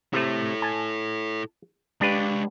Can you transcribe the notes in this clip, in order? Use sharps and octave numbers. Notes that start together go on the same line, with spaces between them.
C3 A3 E4 A4
G#5 A5
G#3 D4 G4 B4 F5